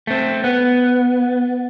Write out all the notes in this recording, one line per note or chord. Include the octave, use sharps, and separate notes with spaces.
A3 C4
B3